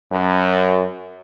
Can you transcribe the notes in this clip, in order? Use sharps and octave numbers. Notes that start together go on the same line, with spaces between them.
F#2